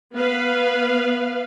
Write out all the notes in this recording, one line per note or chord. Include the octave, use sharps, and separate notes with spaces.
B3 B4 F5